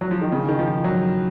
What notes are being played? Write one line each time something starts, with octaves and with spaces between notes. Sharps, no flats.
F#3
F3
D#3
C#3
D#3
F3
F#3